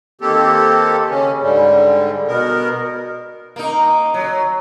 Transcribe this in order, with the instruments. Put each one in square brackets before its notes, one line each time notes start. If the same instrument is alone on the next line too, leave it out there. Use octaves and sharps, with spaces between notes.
[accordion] D#3 A#3 C4 G4 A4
C#3 C#4
G#2 D3 G3
B2 B3 A#4
[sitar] A#3 D#4
F#3